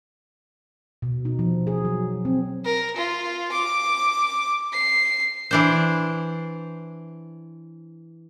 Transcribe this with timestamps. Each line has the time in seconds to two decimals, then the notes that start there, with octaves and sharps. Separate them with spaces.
1.02 B2
1.25 D#4
1.39 F3
1.67 G#4
1.85 F#3
2.25 C4
2.64 A#4
2.96 F4
3.52 D6
4.73 C7
5.51 E3 D4 C5